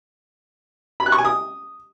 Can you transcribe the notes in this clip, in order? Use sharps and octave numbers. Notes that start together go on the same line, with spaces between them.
B5
F#6
C#6
G#5
D#6